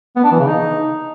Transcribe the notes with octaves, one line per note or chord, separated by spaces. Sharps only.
B3
D4
E3
C#3
D#4